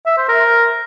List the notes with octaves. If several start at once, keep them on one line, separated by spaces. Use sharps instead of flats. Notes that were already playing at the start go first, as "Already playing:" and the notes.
E5
C5
A#4